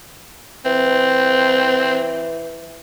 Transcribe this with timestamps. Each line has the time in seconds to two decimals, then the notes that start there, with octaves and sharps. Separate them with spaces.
0.65 E3 C4